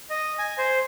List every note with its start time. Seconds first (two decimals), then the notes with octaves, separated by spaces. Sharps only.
0.10 D#5
0.39 G#5
0.58 C5